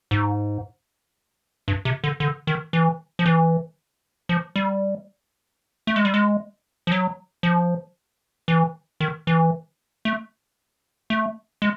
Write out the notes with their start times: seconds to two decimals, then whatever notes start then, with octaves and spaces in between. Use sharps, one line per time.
0.11 G#2
1.68 G2
1.85 C3
2.04 D3
2.20 D3
2.47 D#3
2.73 E3
3.19 F3
3.26 E3
4.29 F3
4.56 G3
5.87 A3
5.96 G#3
6.05 G3
6.14 G#3
6.87 F3
6.92 F#3
7.43 F3
8.48 E3
9.00 D#3
9.27 E3
10.05 A3
11.10 A3
11.62 G#3